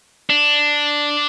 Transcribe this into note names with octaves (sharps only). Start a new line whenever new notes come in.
D4